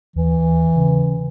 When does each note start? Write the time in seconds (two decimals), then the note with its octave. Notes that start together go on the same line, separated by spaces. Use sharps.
0.16 D#2 E3
0.76 C#3